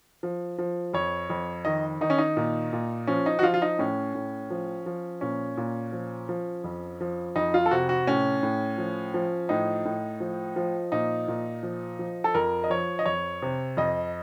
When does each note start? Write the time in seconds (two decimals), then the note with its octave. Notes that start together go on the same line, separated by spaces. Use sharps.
0.23 F3
0.58 F3
0.94 F2 C#5
1.30 F2
1.65 D#3 D#5
2.01 D#3 D#4
2.10 C#4
2.18 D#4
2.37 A#2
2.73 A#2
3.07 F3 C#4
3.26 D#4
3.39 F#4
3.43 F3 F4
3.54 F4
3.62 D#4
3.79 A2 C#4
4.15 A2
4.51 F3
4.86 F3
5.21 A#2 C#4
5.57 A#2
5.92 F3
6.29 F3
6.64 F2
7.01 F3
7.36 F2 D#4
7.54 F4
7.66 A4
7.71 C3 F#4
7.89 F#4
8.07 A2 C#4
8.43 A2
8.78 F3
9.14 F3
9.49 A2 D#4
9.85 A2
10.20 F3
10.56 F3
10.92 A#2 D#4
11.28 A#2
11.63 F3
11.99 F3
12.24 A4
12.35 F2 A#4
12.64 D#5
12.70 F3 C#5
12.99 D#5
13.06 F2 C#5
13.42 C3
13.77 F2 D#5